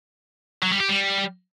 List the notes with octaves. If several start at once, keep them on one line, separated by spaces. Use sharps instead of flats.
F#3
G3
G4
G3